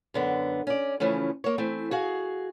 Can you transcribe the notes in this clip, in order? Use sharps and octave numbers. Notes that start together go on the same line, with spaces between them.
F#2 D3 B3
C#4 D5
C#3 E3 F3 A3 C#4
A#3 C#5
E3 A3 C4
F#4 G#4 F5